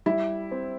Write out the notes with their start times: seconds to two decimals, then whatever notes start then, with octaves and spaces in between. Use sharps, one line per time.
0.06 G3 E4
0.51 C4